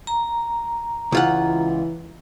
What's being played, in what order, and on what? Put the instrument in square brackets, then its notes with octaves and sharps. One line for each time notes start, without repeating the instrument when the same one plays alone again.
[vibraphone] A#5
[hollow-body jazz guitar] C#2 F4 F#5 [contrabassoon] E3